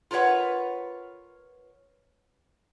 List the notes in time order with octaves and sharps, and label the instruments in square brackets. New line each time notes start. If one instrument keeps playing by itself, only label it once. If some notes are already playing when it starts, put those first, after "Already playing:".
[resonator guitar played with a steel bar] F4 A#4 B4 C#5 F#5